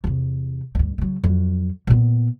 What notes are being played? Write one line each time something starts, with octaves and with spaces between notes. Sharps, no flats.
E2 C3
D2 G2
C#3 F#3
F2 F#3
A#2 B3